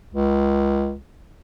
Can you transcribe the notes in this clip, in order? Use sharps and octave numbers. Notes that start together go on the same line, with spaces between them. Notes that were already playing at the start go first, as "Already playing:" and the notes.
C#2